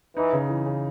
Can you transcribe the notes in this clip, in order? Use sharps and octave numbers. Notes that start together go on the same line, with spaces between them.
E3 D#4
C#3
E3
C#3